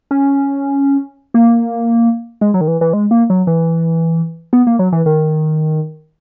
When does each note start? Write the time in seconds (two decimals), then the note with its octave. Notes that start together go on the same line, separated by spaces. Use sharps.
0.11 C#4
1.34 A#3
2.41 G#3
2.54 F#3
2.61 D#3
2.68 E3
2.81 E3
2.93 G#3
3.11 A#3
3.30 F#3
3.47 E3
4.53 B3
4.67 A#3
4.79 F#3
4.92 E3
5.06 D#3